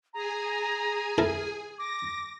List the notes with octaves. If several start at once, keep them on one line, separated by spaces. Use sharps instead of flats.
G#4 G#5 A#5
E4 A4 A#4
D6 A#6